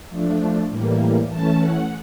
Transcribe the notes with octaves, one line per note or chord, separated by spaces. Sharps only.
F3 A3 D4
A2 E3 G3 A#3
E3 A3 C#4 A5
F#5